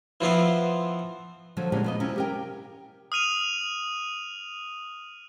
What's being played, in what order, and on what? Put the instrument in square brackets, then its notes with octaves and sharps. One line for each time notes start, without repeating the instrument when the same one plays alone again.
[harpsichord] E3 F3 B3 C4
[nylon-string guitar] D3 F3 F#3
A#2 D3 E3 G3 G#3 C#4
F3 B3 D#5
C3 F#3 C#4 E4
G4 A#4 G5
[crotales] D#6 F6 D#7 F7